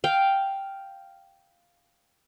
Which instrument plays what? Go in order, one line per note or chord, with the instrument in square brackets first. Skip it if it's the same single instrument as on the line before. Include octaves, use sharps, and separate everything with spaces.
[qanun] F5 G5